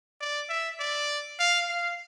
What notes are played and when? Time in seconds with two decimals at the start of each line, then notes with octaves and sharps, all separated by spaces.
0.20 D5
0.49 E5
0.79 D5
1.39 F5
1.69 F5